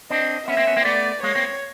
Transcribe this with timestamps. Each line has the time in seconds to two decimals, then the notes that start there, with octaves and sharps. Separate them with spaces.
0.10 C4 D4 D#5
0.48 B3 C#4 E5
0.57 A#3 C4
0.67 B3 C#4
0.76 A#3 C4
0.85 A3 B3 D5
1.23 G#3 A#3 C#5
1.35 A#3 C4